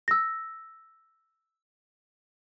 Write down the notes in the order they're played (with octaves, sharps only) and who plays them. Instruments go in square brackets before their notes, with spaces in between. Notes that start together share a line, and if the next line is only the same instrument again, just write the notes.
[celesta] E6 A#6